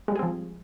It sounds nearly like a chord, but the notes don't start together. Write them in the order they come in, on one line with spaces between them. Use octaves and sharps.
G#3 G3 G#4 C4 F3